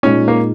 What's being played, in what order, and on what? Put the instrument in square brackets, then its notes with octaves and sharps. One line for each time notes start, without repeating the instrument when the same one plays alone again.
[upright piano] A#2 G#3 D#4 [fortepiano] C#4
[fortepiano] A#3